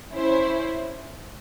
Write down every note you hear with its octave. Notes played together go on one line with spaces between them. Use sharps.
C#4 E4 C5